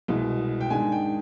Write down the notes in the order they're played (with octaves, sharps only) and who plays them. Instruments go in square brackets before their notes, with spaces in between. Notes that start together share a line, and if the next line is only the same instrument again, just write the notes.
[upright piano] C2 B2 G#3
G5
G#2 D#3 G#3 D4 G#5
G5